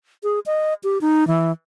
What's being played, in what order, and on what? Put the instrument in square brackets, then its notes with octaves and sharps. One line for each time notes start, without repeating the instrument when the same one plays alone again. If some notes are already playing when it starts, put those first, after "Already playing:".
[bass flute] G#4
D#5
G4
D#4
E3